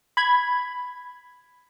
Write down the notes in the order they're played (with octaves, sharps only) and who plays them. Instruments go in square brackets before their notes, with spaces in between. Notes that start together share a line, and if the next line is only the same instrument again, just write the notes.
[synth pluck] B5 G#6